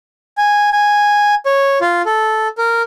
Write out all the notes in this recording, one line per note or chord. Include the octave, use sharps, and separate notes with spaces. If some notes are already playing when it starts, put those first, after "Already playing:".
G#5
G#5
C#5
F4
A4
A#4